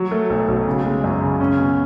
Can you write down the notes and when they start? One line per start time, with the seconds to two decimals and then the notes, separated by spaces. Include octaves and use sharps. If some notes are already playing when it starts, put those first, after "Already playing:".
Already playing: F#3
0.11 A3
0.30 B1
0.48 B1
0.67 C#3
0.85 G#3
1.04 F#2
1.22 C#3
1.41 C#4
1.59 B2